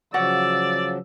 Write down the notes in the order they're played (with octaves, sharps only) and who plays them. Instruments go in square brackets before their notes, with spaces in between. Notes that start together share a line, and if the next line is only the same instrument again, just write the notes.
[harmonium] C#3 F3 F#3 [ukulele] F#4 C#5 F#5 [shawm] D5 [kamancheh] E6